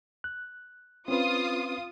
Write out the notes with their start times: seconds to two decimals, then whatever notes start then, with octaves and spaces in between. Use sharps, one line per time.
0.24 F#6
1.08 C4 C#4 F4 B4 D#6